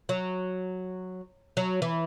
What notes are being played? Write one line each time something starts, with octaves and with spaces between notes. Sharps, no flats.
F#3
F#3
E3